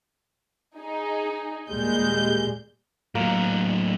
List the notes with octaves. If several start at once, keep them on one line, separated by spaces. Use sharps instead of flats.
D#4 G#4
D#2 A#2 G3 G#3 G6
A2 F#3 A#3